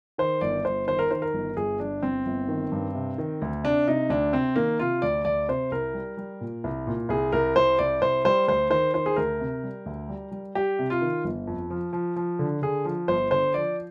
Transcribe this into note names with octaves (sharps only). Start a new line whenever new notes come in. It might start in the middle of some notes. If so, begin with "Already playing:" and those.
D#3 C5
G1 D5
G1 C5
D#3 C5
A#4
D#3 C5
A#4
G1
G1 G#4
G1 D4
G1 C4
G1
D#3
G2
C3
D#3
D2
C3 D4
C3 D#4
D2 D4
C3 C4
D#3 A#3
C3 F4
D2 D5
D2 D5
C3 C5
C2 A#4
G3
G3
A#2
C2
A#2
C2 G#4
C2 A#4
C2 C5
C2 D5
C2 C5
G3 C5
D2 C5
D#3 C5
D#3 C5
G#4
D2 A#4
C3
G3
D2
G3
G3
G3 G4
C3
F4
D#3
G1
F2
F3
F3
F3
D3
D3 G#4
F3
G1 C5
D3 C5
F3 D5